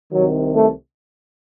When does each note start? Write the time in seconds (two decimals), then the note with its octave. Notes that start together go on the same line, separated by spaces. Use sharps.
0.12 C2 C3 D#3 F#3
0.54 A3